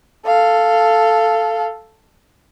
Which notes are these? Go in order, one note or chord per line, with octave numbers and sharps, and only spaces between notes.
A4 F5